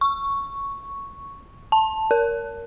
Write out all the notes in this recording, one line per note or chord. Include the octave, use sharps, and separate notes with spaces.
C#6
A5
A#4